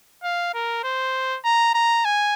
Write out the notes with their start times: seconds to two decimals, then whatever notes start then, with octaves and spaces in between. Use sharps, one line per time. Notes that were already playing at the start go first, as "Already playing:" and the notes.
0.24 F5
0.54 A#4
0.84 C5
1.45 A#5
1.74 A#5
2.05 G#5